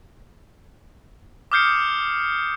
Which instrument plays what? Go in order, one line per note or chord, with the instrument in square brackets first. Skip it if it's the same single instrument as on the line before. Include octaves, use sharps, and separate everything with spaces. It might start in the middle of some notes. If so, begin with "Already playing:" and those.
[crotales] D6 D#6 F6 G6 C7 C#7